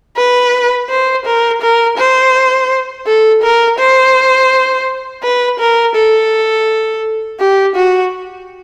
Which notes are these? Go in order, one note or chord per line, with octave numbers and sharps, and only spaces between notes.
B4
C5
A#4
A#4
C5
A4
A#4
C5
B4
A#4
A4
G4
F#4